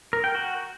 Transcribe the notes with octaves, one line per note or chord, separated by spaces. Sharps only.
A#4
G5
F#4